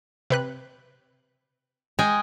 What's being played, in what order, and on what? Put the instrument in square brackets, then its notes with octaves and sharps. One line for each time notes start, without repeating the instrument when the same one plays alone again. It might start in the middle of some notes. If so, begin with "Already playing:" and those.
[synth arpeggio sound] C3 B4 F#6
[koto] G#3 G5 G#5